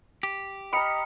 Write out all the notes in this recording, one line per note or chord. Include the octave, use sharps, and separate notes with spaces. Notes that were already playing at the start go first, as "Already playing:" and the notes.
G4
D#5 G5 A#5 B5 F6 C#7